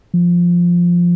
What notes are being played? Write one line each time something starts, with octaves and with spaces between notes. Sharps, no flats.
F3